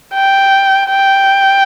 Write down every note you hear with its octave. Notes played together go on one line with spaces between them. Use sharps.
G5
G5